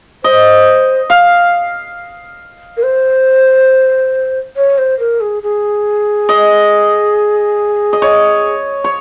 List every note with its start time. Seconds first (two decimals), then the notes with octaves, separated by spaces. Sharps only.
0.24 C5 D#5
1.10 F5
2.77 A#4
2.83 C5
4.57 C#5
4.78 C5
4.99 A#4
5.21 G#4
5.43 G#4
6.29 D#5
7.93 D#5
8.02 C#5
8.84 C#5